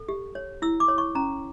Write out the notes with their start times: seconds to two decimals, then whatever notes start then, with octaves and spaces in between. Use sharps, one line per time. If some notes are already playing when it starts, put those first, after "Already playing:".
Already playing: A4
0.09 G4
0.35 C#5
0.62 E4 E6
0.80 D6
0.88 C#5
0.98 C#6
1.15 C#4 A#5